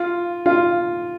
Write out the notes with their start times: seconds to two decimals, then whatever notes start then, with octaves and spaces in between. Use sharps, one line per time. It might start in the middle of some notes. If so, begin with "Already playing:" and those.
Already playing: F4
0.46 F4